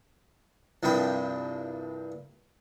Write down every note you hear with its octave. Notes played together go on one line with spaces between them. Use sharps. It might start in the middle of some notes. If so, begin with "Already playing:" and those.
C2 G2 F3 C4 B5